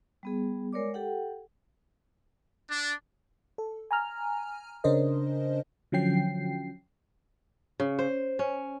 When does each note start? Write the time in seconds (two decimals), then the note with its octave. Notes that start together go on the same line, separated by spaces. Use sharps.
0.23 G3 B3 G#4
0.73 G#3 A#4 C#5 D5 D6
0.94 G4 A4 F#5 G5
2.69 D4
3.58 A4
3.91 G#5 A#5 F6
4.84 C#3 C#4 D4 A#4 C5 D#5
5.92 D3 F3 F#3 C#4 G5 C7
7.80 C#3
7.99 C5
8.39 C#4